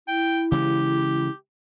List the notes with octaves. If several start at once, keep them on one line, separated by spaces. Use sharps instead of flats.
E4 G5
C#3 E3 G#3 G4